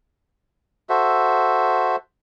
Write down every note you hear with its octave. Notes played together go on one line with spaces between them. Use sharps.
F#4 A4 C5 E5